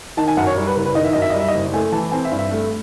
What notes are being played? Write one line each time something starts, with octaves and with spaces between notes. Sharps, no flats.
D#3 A5
G#5
F#2 F#5
C#5
G3
B4
F#1 A#4
B4
D#3 D#5
E5
F#2 D#5
E5
D#5
G3
E5
D#5
F#1
A3 G#5
E3 A5
C4 G#5
E5
G2
E5
A3